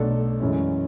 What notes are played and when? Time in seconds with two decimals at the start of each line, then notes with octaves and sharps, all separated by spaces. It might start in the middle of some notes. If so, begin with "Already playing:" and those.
Already playing: B1 B2 A3 D4 A4
0.40 F#2 E3 G#3 C#4